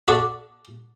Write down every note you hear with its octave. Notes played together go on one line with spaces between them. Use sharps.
D4 F#4 A4 C#5 D5